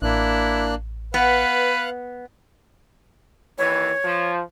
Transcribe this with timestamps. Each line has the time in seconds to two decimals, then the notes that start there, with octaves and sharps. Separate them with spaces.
0.02 A1 A#3 D4 E4 F#6
1.14 B3 B4 F5 F#5 F#6
3.58 D#2 E3 C#5
4.04 F3